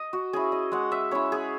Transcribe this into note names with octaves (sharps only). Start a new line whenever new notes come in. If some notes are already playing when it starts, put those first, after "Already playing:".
Already playing: D#5
F#4
C#4 E4 G#4
D#5
G#3 F#5
E5
C#4 E4 C#5
G#4